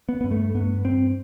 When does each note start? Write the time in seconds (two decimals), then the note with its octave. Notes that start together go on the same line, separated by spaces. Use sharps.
0.09 B3
0.21 G2 B3
0.31 A3
0.55 G2 B3
0.85 G2 C4